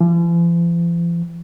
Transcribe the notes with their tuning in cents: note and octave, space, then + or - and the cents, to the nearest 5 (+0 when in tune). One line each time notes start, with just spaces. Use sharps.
F3 -45